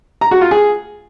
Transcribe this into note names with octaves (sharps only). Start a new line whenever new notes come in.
A#5
F#4
F4
G#4